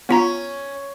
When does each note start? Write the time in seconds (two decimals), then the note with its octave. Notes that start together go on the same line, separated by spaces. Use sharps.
0.09 B3 C#4 F4 A#5